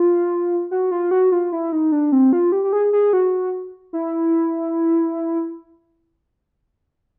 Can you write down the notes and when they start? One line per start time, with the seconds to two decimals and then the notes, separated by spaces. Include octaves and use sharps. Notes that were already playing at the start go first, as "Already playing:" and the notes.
Already playing: F4
0.71 F#4
0.91 F4
1.11 F#4
1.32 F4
1.52 E4
1.72 D#4
1.92 D4
2.12 C4
2.33 F4
2.52 G4
2.64 G4
2.73 G#4
2.93 G#4
3.13 F#4
3.93 E4